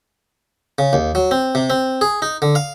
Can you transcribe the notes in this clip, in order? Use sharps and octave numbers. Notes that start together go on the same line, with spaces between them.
C#3
D#2
F#3
C4
C3
C4
G#4
D#4
D3
F5